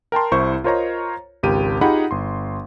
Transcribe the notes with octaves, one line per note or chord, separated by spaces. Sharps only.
A#4 G5 A5 C6
C2 E4 C5 C#6
F4 A#4 C5 C#5 D#5 A#5
G#1 C#2 G4 A#4 D#7
D#4 F4 G4 G#4 F#5 B5
G1 C6